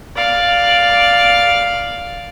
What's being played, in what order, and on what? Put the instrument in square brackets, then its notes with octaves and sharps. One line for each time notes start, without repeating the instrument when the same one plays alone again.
[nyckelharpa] D5 F5